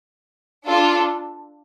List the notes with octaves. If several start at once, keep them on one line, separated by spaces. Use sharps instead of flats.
D4 F4 A4